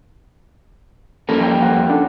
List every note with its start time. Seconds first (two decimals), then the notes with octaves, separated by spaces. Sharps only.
1.29 F2 G3 A#3 C#4 A4
1.43 G5
1.62 F#5
1.89 C#4 D4 A4